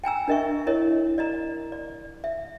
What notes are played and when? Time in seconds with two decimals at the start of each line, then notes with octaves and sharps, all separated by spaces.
0.04 G5 G#5 A#5 E6
0.28 D4 A#4 D#5 E5 C#6
0.67 E4 A#4 C#5 D#5
1.18 D5 D#5 A#5
1.72 D5
2.24 E5